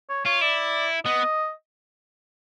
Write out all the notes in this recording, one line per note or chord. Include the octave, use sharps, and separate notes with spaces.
C#5
F4 C#5
E4 D5
B3 D#5